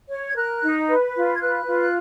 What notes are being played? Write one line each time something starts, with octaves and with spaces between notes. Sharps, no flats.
C#5
G#6
A#4 F#6
D#4
B4
F4
G#6
B4 F#6
F4